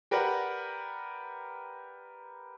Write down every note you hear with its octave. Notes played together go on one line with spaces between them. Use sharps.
G4 A#4 B4 D5 F#5